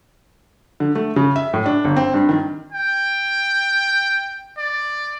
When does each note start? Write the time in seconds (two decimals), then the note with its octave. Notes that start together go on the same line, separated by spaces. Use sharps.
0.80 D3
0.95 A3
1.16 C#3
1.36 E5
1.53 A2
1.66 D4
1.85 G1
1.96 C4
2.14 G2
2.29 D#3
2.72 G5
4.58 D5